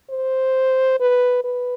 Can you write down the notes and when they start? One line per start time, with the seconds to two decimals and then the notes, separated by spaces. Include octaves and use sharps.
0.10 C5
1.00 B4
1.44 B4